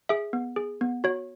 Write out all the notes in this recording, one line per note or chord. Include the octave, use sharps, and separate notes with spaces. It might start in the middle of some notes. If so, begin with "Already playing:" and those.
G#4 E5
B3
G#4
B3
F#4 C#5